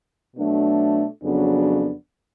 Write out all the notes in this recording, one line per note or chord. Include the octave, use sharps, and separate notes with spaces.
B2 F#3 A3 D4
F2 C#3 F#3 B3 D4